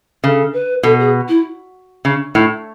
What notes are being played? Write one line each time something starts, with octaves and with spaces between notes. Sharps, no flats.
C#3 A4
B4
B2 A4
G#4
E4
C#3
A2